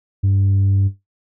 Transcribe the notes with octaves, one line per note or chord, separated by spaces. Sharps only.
G2